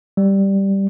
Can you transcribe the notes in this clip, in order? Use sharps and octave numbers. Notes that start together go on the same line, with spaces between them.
G3